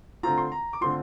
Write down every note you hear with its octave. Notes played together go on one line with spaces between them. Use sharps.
D3 A3 C4 F4 A#5
C6
A#5
D6
D3 A3 C4 F4 C6